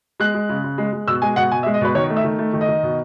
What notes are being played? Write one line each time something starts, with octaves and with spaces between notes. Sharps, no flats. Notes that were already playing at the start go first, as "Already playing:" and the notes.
G#3 F#6
G#3
C#3
C#3
G#3
G#3
B2 E6
G#3 G#5
B2 F#5
B2 G#5
E5
G#3
D#5
B2 B4
D#3 C#5
A3
E5
D#3
A3
D#3
D#5
D#3
B2